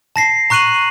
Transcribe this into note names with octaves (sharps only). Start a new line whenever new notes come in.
A5 A#6 C7
A#5 C#6 F#6 C7 D#7 F#7